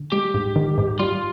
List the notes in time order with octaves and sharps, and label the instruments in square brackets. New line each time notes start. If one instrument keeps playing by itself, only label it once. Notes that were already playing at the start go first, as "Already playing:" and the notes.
Already playing: [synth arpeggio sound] D3
[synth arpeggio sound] G#3 [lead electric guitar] G4
[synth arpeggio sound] G#2
D#3
G#2
[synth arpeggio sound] G3 [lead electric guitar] F4